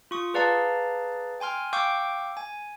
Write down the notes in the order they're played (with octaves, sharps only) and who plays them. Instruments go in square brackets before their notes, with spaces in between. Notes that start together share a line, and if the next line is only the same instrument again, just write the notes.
[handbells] F4 C#6 D#6
G#4 B4 D5 F5 A5 A#5
G5 G#5 C6 F6
F5 G5 C#6 D6 E6 G6
G#5